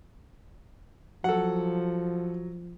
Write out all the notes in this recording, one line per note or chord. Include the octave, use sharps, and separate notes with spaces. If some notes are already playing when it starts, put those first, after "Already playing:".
F3 F#3 A4 F#5